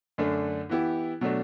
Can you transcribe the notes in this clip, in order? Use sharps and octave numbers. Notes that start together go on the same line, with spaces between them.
F#2 D3 A3 D4
E3 B3 E4 G4
B2 F#3 A3 D4